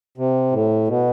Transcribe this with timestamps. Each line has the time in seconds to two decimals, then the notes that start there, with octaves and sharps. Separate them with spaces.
0.18 C3
0.52 A2
0.88 B2